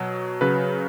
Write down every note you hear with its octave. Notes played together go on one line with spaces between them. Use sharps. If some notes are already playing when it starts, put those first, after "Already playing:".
Already playing: B2 F#3
C#3 F#3 B4